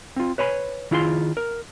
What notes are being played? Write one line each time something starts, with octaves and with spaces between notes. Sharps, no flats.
C4 F4
B4 C#5 G#5 B5
D#3 E4 F4 G#4 E5 C6
A#4